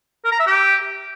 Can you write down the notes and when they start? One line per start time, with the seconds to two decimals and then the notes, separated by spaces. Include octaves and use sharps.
0.25 A#4
0.32 A#5
0.40 E5
0.47 G4